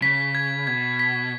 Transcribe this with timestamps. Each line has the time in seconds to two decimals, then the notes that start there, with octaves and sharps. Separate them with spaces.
0.02 C#3 B6
0.35 G#6
0.67 B2 G#6
0.99 B6